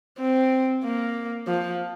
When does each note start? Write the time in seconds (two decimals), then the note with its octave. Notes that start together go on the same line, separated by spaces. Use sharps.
0.18 C4
0.84 A#3
1.47 F3